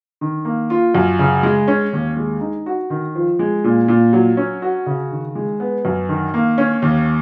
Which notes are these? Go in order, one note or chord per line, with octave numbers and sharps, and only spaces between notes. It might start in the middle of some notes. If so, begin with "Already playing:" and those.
D#3
A#3
F4
F#2
C#3
G#3
C#4
D#2
G#3
D#4
F#4
D#3
F3
G#3
A#2
A#2
F#3
C#4
F#4
C#3
D#3
G#3
B3
F#2
D#3
A#3
C#4
D#2